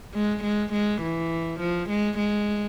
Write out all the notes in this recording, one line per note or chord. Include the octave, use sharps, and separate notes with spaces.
G#3
G#3
G#3
E3
F3
G#3
G#3